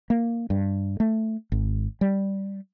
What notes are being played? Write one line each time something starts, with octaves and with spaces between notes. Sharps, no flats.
A#3
G2
A3
G#1
G3